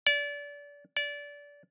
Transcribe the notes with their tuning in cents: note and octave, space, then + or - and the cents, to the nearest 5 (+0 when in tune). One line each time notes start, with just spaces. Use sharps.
D5 -30
D5 -25